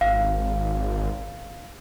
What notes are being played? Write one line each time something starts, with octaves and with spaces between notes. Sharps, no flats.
G#1 F5